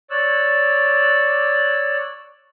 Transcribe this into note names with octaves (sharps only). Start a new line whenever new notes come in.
C#5 D5 E6 F#6